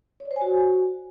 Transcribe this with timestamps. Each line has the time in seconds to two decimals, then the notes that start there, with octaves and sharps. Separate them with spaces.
0.20 C#5
0.25 D5
0.31 C5
0.36 G#5
0.41 F#4